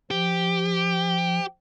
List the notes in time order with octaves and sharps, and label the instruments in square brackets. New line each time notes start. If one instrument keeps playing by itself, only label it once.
[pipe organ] F3 [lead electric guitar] G4